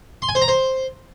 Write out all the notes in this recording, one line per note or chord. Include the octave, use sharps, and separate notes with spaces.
C6
G#5
C5
A#5
C5